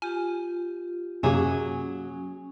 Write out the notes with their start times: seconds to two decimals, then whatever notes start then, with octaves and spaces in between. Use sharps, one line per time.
0.02 F4 G4 G#5
1.23 F#2 C3 F#3 A#3 C#4 G#4 G#5